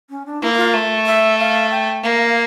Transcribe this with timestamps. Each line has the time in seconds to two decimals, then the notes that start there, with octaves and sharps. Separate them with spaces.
0.10 C#4
0.26 D4
0.41 A#3 E4
0.53 E4
0.57 F4
0.74 A3
1.06 E5
1.38 F5
1.70 G5
2.03 A#3 F5